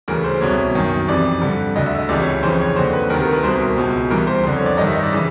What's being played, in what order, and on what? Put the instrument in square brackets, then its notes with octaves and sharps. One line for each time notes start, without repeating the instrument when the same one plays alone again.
[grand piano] D2 C#3 E3 A#4
C5
C2 B2 C#5
F#2 D#3
F2 C3 E3 D5
G2 D3
D2 D3 D#5
E5
D#5
C#2 C3 E3 D5
C#5
C#5
F2 C#3 E3 C5
C#5
D#2 D3 C5
B4
D2 C3 D#3 A#4
A#4
B4
C2 B2 C5
A#4
C#2 B2
C2 C3 E3 A#4
C5
F2 C5
D3
C#5
D5
G2 D#3 D#5
E5
D#5
D5
C#3 E3